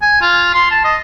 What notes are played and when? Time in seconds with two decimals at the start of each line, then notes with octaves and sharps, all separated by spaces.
0.02 G#5
0.21 F4
0.54 C6
0.71 A5
0.84 D#5